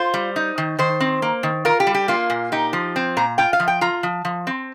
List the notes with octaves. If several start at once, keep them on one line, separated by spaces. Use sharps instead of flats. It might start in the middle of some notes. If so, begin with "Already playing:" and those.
Already playing: F4 C5
G3
D#4
D#3
D#3 C5
C4
A#3
D#3
F4 A#4
G4
G3
G4
A#3 F4
A#2
D#4 G4
F3
C4
A#2 A#5
F4 G5
F5
F3
G5
F4 A#5
F3
F3
C4